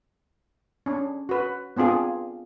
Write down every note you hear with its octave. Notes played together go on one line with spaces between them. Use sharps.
C#4 D4
F#4 B4
B3 C4 D4 F4 G#4